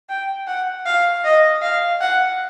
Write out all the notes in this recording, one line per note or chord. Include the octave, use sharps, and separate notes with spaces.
G5
F#5
F5
D#5
F5
F#5